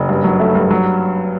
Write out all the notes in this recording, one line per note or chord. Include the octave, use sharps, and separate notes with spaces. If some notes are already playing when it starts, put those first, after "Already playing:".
Already playing: F#1
G2
F#3
A3
G2
F#3